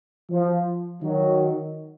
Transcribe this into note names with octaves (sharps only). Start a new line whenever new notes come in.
F3
D#3 F#3